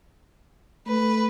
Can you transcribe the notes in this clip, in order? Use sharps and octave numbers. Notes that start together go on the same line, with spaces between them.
A3 B4